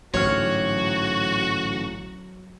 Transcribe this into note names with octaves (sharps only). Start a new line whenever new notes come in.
A1 G#2 D3 F#3 F#4 C#5 F6